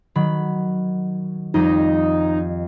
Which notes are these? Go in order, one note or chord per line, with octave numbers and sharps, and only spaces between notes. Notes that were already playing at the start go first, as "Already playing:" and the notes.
D#3 F#3 B5
F2 G3 D#4 D#5